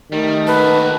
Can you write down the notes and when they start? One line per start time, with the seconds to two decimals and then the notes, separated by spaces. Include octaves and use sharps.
0.12 D#3 G3 A3
0.47 F#4 A4 B4